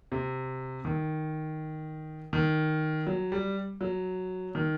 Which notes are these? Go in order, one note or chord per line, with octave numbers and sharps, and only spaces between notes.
C3
D#3
D#3
F#3
G3
F#3
D#3